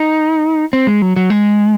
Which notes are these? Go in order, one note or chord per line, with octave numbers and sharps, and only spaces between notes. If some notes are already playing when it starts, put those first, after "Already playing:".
Already playing: D#4
C4
G#3
F#3
F#3
G#3